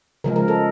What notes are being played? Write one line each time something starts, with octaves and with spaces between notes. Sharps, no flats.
C#3 F3 G#3 A#4
A#4
A4